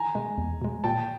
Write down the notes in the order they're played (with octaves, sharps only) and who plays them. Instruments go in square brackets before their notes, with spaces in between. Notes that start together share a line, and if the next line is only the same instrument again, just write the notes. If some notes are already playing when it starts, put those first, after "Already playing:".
Already playing: [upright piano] G#5 A#5
[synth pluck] B2 G#3
E2
B2 G#3
[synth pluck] A#2 [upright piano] G5 A5